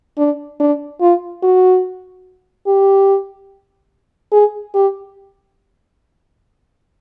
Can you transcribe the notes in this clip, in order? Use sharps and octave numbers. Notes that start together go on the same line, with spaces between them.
D4
D4
F4
F#4
G4
G#4
G4